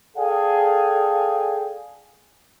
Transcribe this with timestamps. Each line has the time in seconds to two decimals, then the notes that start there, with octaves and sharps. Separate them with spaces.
0.17 G#4 A4 D5 F5 G5 G#5